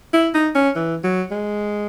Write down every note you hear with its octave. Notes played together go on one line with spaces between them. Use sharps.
E4
D#4
C#4
E3
F#3
G#3